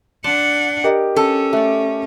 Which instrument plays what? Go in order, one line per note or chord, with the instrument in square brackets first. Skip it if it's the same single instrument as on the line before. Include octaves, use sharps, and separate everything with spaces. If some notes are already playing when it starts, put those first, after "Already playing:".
[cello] D4 F#5 [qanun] D5 A5 C6
[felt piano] G4 A#4 D#5
[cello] C#4 [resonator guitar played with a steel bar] A4
[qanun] A3 D5